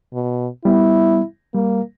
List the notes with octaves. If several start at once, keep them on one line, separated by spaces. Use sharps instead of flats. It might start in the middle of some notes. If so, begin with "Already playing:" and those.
B2
G3 B3 E4
G3 A#3